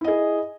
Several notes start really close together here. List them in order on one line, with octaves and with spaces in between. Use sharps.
E4 D#5 G#4